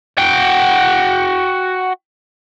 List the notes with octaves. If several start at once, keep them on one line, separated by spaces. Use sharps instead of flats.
F#4 G5